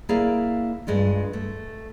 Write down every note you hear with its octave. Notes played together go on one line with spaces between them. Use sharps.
A#3 E4 G#4 D5 F5
G2 G#3 D4 F4
A3